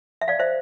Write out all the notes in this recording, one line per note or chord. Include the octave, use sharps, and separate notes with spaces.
E5
D5 F5
C5 E5